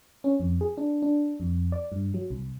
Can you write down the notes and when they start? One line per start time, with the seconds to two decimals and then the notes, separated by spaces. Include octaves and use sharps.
0.24 C#4
0.40 F2
0.61 G#4
0.77 D4
1.02 D4
1.40 F2
1.72 D5
1.92 G2
2.14 F#3
2.30 C2